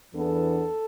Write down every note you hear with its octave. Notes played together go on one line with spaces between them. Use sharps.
E2 E3 B3 D4 A4